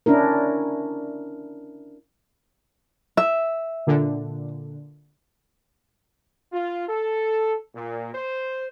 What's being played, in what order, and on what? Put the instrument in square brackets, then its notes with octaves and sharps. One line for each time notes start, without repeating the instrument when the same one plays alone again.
[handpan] C#4 D4 E4 A#4
[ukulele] E5
[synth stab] A#2 D3
[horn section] F4
A4
A#2
C5